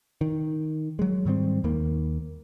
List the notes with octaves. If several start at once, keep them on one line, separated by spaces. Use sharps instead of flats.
D#3
F#3 G#3
G#2 D#3 G3 C4
D#2 D#3 A#3